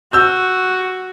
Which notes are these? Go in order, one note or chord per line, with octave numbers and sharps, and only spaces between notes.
F#4 E6 G6